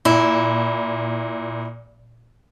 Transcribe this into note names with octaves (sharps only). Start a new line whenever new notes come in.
A#2 E4